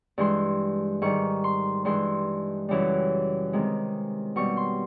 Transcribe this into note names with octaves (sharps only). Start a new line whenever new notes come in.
G2 E3 G#3 C6
G#2 D#3 G3 C#6
C6
G2 E3 G#3 C6
F#2 C#3 E3 G3
C3 D#3 G#3
B2 G3 C#6
C6